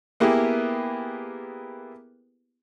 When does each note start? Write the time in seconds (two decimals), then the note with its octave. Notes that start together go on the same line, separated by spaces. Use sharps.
0.20 A#3 B3 E4 G4 G#4 B4